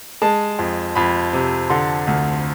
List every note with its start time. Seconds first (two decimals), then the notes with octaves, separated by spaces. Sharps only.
0.22 G#3 A5
0.59 F2
0.95 F2 B5
1.33 C3
1.70 D3 C6
2.07 D2